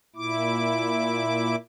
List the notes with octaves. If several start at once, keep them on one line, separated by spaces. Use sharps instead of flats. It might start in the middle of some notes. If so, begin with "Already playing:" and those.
A#2 E4 D6